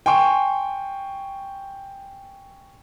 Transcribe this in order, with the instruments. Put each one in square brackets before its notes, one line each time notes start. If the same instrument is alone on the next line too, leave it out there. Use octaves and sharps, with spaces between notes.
[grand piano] G5 G#5 C6 C#6